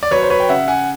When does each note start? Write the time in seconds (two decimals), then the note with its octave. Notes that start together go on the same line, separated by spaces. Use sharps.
0.03 D5
0.11 F#3 B4 C#5
0.23 C5
0.30 B4 C#5
0.40 G5
0.49 C#3 E5 F#5
0.68 F#5 G#5